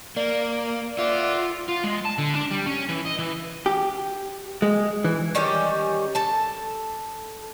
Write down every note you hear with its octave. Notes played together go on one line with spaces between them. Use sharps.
A#3 D5
F4 E5 F#5 D6
F4
G#3
A5
D3
D4
G3
C#4
E3
D#5
E3
G4
G#3
E3
D#3 G3 C#4 G4
A4 A5